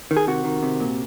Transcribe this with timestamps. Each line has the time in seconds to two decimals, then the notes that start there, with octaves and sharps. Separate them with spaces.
0.11 D#3
0.17 G#4
0.27 C3 F#4
0.45 D#3
0.63 C3
0.80 A#2